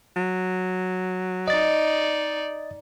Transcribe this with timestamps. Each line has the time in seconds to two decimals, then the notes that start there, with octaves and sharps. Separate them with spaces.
0.16 F#3
1.48 D#4 D5 D#5 A6